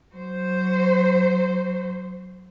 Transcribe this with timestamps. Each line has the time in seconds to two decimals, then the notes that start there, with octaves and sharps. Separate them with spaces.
0.15 F#3 C5